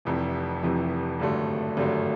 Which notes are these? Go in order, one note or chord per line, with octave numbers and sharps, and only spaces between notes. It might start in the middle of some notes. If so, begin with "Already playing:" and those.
F1 F2 C3 E3
F1 F2 C3 E3
G#1 G2 D3 F#3 A3
G#1 G2 D3 F#3 A3